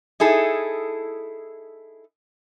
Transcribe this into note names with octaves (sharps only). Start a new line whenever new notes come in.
D#4 E4 G#4 A4